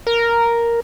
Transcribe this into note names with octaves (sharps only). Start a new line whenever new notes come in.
A#4